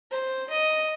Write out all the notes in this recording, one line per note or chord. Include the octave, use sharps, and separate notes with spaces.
C5
D#5